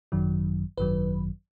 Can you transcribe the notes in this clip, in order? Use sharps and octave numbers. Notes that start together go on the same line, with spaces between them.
G#1 F#2 D#3 F#3
G#1 F#2 D#3 F#3 B4